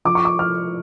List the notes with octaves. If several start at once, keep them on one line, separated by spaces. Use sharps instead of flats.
F3 D6
C#6
D6
F3 F6